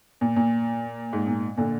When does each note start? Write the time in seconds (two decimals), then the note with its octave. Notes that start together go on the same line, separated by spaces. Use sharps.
0.21 A#2
0.36 A#2
1.13 G#2
1.27 A#2
1.57 A#2 D3